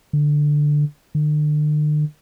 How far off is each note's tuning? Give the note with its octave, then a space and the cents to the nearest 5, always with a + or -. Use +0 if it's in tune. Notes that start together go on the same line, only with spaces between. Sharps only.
D3 +5
D3 +40